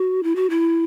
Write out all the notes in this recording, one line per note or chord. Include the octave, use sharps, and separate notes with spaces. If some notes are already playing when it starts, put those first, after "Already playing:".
Already playing: F#4
E4
F#4
E4